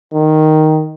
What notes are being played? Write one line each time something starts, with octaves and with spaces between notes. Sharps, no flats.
D#3